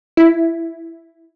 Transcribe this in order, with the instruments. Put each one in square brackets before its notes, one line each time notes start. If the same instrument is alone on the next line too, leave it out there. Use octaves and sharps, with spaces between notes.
[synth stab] E4